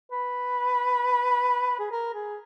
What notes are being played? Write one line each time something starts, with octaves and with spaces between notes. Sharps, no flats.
B4
G#4
A#4
G#4